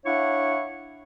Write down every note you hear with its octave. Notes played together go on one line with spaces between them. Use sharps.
D4 E4 C#5 F5 F#5 C#6